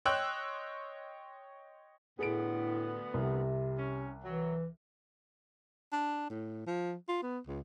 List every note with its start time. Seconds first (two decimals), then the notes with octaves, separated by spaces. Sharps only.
0.06 C#5 D#5 G5 C6 E6 F#6
2.19 D2 A2 D3 B3 G#4 D7
3.14 C2 C3
3.78 C#4
4.24 E3 F#3
5.92 D4
6.30 A2
6.67 F3
7.09 F4
7.22 B3
7.47 C#2